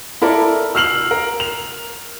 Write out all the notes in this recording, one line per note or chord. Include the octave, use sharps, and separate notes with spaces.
E4 A4 A#4 D5
E6 F6 C7 F7 F#7
A#4
F7